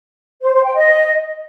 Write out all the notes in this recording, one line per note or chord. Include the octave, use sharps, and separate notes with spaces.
C5
C5
G5
D#5